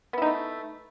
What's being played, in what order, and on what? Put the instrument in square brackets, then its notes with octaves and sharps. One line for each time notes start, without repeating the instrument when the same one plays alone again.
[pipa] B3
E4
D#4
A3